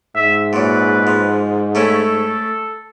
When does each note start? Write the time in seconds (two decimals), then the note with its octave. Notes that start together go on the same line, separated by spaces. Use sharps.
0.15 G#2 E5
0.53 F#2 A#2 B4
1.07 F3
1.75 A3 C#4 E4 A4